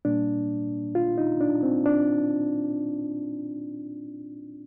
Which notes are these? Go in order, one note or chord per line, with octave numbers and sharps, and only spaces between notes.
A#2 G3 A#3 D4
F4
D#4
D4
C4
D4